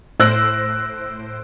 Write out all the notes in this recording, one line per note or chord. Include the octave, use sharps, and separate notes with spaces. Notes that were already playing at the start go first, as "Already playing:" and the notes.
A2 C5 E6 F#6 A#6 D7